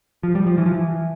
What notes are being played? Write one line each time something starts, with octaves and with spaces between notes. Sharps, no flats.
F3
G3
F3
E3
F3
E3